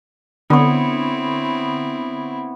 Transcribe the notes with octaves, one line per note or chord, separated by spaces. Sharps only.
D3 B3 C4 E4 C#5